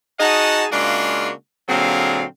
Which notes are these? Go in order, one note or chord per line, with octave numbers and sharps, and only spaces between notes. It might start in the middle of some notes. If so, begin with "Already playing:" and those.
D#4 F#4 G#4 D#5 F#5 A5
C#3 G#3 A#3 D4 F4 F#4
A#2 D3 F#3 C4 G#4 F5